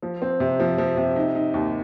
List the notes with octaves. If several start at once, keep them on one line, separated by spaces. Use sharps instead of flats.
F3
C4
C3
F3
F3
C3
D#4
D#4
D#2